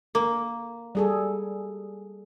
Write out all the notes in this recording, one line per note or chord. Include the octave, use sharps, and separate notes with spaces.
A#3
G3 G#4 A4